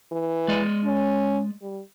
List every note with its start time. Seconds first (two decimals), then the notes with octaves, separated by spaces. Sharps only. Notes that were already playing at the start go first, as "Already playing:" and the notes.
0.12 E3
0.48 G#3 D5 D#5
0.84 C#4
1.62 G3